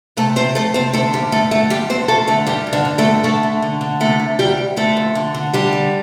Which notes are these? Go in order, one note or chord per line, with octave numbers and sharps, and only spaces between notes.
C3 A3 A4
C3 C4 C5
F2 A3 A4
C3 C4 C5
D3 A3 A4
G2 G3 G4
G2 A3 A4
D3 A3 A4
F2 G3 G4
D3 C4 C5
F2 A3 A4
D3 A3 A4
G2 G3 G4
G2
D3 D4
D3
A3 A4
G2
D3 A3 A4
D3
D3
D3
C3 A3 A4
C3
D2 G3 G4
D2
D3 A3 A4
F2
D3
D3
D3 G3 G4
D3